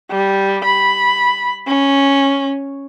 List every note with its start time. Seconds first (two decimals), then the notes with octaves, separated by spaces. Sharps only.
0.11 G3
0.64 B5
1.68 C#4